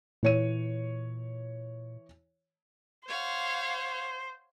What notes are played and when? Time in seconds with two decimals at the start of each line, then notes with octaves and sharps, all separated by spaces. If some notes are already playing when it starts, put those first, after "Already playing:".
0.23 A#2 E3 C#5 D#7
3.08 C5 C#5 F5 F#5